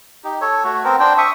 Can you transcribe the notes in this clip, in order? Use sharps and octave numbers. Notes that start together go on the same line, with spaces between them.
D#4 G4
A4 C#5
A3 F#4
B3 C4 A#4 C5
D4 C5 G5
E5 C#6 D#6